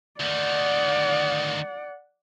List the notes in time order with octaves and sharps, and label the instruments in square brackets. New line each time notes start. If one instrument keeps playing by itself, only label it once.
[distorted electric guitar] D2 D#3 [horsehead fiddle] D5 F#5